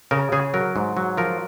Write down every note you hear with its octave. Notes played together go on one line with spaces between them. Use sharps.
C#3 A#4
C#3 G#4
F#3 A#4
G#2
F#3
F3 A#4